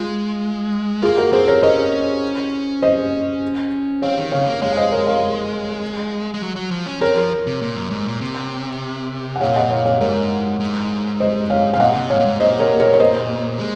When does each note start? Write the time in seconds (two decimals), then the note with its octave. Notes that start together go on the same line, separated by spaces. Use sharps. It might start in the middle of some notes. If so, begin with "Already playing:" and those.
Already playing: G#3 F4
1.02 A#3 F4 G#4
1.18 F#4 A#4
1.32 C4 G#4 C5
1.48 A#4 C#5
1.62 C#4 C5 D#5
2.82 C5 D#5
4.02 C4 C#5 F5
4.18 D#3
4.32 C#3 C#5 F5
4.47 A#3
4.62 G#3 C#5 F5
4.72 F5
4.77 C5 D#5
4.92 A#4 C#5
5.07 C#5 F5
6.34 G#3
6.42 F#3
6.56 F#3
6.71 F3
6.86 C#4
7.01 C4 A#4 C#5
7.16 F3
7.47 C3
7.61 A#2
7.76 F#2
7.91 G#2
8.06 A#2
8.21 C3
9.36 F#5
9.41 A#2 C#5 F5
9.56 D#5 F#5
9.70 C#5 F5
9.85 C#5 F5
10.01 G#2 A#4 C#5
10.60 G#2
11.20 C5 D#5
11.50 C#5 F5
11.73 G#2 F5
11.80 A#2 D#5 F#5
11.96 C3
12.10 G#2 C#5 F5
12.20 A#2
12.25 G#2
12.40 A#2 C5 D#5
12.60 A#4 C#5
12.80 A#4 C#5
12.93 C#5
12.99 C5 D#5
13.59 G#3